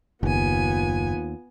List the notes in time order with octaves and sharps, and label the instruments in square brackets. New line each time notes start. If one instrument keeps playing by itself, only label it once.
[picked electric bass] F#1 [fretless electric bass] D#2 [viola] B3 G#5 [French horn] F4